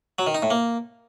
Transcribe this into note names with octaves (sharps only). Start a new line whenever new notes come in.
F#3
D#3
D#4
A2
A#3